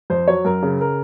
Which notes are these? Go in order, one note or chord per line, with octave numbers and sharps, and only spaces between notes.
F2 C5
F#3 C#5
F#2 A#4
C#3
A#4